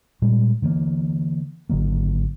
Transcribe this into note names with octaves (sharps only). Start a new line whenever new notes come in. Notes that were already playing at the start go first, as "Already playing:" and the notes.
A#2 G3 G#3
D3 E3 G3 A#3
G#1 D3 F#3 A#3